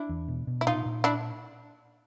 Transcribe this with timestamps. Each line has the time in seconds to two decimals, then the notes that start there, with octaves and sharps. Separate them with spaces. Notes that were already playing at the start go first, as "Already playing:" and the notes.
Already playing: D4 E4
0.09 E2
0.28 B2
0.47 B2
0.61 E4
0.67 A#2 D#4 F4
0.86 A#2
1.04 D4 E4